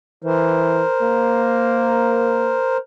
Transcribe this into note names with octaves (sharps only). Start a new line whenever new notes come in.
E3 A#4 C5
A#3